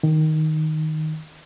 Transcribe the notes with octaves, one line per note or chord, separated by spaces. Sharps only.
D#3